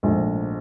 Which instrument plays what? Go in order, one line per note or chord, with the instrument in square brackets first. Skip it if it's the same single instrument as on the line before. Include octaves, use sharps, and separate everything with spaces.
[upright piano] A#1 G#2 F3 A3